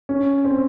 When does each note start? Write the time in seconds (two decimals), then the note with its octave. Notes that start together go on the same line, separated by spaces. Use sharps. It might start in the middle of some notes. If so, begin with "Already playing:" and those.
0.09 C#4
0.45 C4